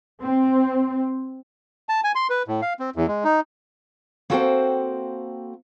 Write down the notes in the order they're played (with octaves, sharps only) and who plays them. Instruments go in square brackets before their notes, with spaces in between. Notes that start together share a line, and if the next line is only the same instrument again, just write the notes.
[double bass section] C4
[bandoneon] A5
G#5
C6
B4
A2
F5
C4
E2
G#3
D#4
[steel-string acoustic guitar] A#3 C4 F#4 A4 C5 G5